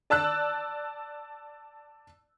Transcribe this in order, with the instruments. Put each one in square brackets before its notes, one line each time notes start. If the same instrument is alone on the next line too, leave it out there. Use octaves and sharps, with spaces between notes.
[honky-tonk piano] D5 A5 E6 F#6